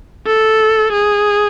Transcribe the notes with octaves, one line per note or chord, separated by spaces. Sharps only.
A4
G#4